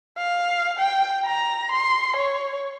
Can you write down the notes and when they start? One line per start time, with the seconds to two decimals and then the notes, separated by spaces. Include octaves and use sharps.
0.18 F5
0.79 G5
1.26 A#5
1.72 C6
2.17 C#5